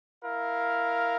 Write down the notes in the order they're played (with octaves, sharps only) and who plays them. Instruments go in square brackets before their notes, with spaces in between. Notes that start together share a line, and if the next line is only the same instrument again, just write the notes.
[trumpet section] E4 A#4 F5